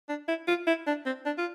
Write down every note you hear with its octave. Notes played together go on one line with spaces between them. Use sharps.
D4
E4
F4
E4
D4
C4
D4
F4